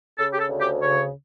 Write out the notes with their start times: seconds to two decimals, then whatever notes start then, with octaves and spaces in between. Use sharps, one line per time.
0.19 C#3 A4
0.32 G4
0.38 A4
0.49 D2
0.60 G4
0.80 C#3 C#5